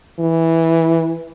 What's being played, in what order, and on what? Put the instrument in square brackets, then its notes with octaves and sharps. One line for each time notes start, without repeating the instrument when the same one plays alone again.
[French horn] E3